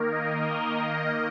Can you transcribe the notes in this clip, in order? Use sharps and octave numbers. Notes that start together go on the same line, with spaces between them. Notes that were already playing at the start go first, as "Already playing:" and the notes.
Already playing: D#3 A#3 A#4
D#5